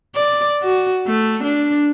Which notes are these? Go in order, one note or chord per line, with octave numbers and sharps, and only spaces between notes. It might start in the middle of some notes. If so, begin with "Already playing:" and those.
D5
F#4
A3
D4